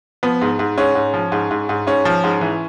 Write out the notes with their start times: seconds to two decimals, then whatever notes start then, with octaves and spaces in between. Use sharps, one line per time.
0.23 F3 B3
0.41 G#2
0.59 G#2
0.77 G#2 C#4
0.95 G#2
1.14 F3
1.32 G#2
1.51 G#2
1.69 G#2
1.87 G#2 C#4
2.05 F3
2.24 G#2
2.41 E3